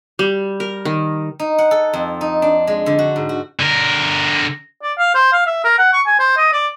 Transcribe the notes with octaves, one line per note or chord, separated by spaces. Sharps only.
G3
A#4
D#3
D#4
F#5
A4
F2
D#4
D4
G#3
D3
F#4
G#2
F#4
D3 A#4
D5
F5
C5
F5
E5
A#4
F#5
C#6
G#5
C5
D#5
D5